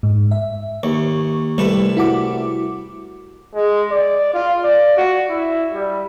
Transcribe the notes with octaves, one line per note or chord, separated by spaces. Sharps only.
G#2
E5
D#2 C#6
C2 G3 A3 B4
E4 F#4 D6
G#3
D5
F4
D5
F#4
E4
G3